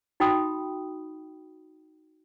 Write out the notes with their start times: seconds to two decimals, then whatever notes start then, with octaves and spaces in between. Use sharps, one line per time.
0.20 D#4 F#4 G5 B5 D#6